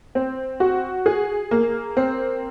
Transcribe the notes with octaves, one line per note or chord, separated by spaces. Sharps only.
C4
F#4
G#4
A#3
C4